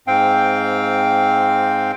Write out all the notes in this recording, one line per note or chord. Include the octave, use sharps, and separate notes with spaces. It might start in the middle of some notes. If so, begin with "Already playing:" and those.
G#2 C4 F5 G5